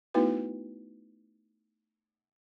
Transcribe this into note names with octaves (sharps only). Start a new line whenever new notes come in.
A3 B3 D#4 E4 F#4 B4